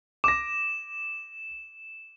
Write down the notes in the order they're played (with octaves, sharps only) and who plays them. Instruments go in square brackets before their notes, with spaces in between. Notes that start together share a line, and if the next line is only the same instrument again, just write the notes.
[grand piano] D6 A#6 [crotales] E7